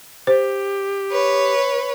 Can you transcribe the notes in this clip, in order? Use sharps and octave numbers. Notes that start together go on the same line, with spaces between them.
G4 C5
B4 C#5